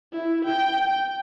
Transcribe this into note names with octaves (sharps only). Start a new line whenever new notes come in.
E4
G5
G5